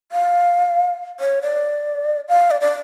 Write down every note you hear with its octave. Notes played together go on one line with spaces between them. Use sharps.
F5
C#5
D5
F5
D5
D5